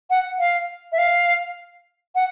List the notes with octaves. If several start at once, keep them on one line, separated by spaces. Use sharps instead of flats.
F#5
F5
E5
F5
F#5